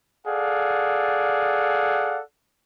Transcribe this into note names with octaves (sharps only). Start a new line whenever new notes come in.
G#4 A4 D5 F5 F#5